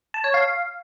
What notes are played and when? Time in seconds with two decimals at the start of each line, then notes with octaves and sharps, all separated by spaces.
0.14 A5
0.24 C#5
0.34 F5